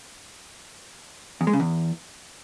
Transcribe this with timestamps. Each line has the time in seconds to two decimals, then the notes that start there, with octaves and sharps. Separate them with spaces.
1.41 E2
1.47 G#3
1.53 C#3
1.60 E2